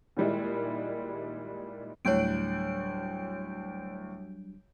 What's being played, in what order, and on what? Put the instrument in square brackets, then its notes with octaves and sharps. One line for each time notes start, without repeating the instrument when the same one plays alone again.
[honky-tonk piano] A#2 D#3 G3 G#3 E4
[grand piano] D2 A2 [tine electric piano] F#3 G3 D4 [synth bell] C#5 G6 D7